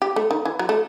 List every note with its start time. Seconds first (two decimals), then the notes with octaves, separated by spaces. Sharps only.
0.02 G4
0.16 A3
0.31 D#3
0.45 E3
0.59 F#3
0.69 A3